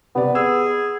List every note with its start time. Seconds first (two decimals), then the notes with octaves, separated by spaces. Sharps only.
0.15 C3 B3 D5
0.35 G#4 E6